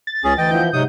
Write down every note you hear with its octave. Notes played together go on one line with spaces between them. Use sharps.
A6
C#2 C#4 G#4
D2 E3 D#5 G5
F3 B3 E4 G6
G#2 C3 F#3 D#4 F#5 D#6